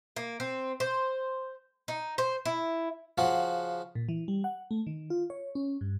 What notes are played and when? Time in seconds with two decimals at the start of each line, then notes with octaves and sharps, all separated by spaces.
0.16 A#3
0.40 C4
0.80 C5
1.88 D#4
2.18 C5
2.45 E4
3.18 C#3 F3 F#4 F5 F#5
3.95 A#2
4.09 E3
4.28 G3
4.44 F#5
4.71 A3
4.87 D#3
5.10 F4
5.30 C#5
5.55 C#4
5.81 G2